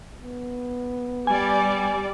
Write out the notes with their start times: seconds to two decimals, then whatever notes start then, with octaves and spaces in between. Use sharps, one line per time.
0.21 B3
1.27 G3 D5 G#5